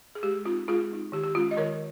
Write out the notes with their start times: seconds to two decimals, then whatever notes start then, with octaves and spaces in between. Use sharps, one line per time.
0.15 G#4
0.23 G#3 G4
0.45 C4 D#4 F4
0.68 G#3 F4 G#4
0.90 C4 D#4
1.12 D#3 G4
1.23 G4
1.35 G#3 C#4 F4
1.51 D#5
1.57 D#3 A#4 C#5